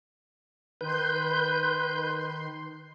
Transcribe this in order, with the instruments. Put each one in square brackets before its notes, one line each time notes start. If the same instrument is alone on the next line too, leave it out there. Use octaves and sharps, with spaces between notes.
[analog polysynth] D#3 C6 [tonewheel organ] B4 G6